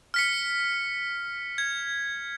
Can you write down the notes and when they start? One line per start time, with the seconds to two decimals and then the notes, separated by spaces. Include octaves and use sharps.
0.14 F6 B6 C#7
1.58 G#6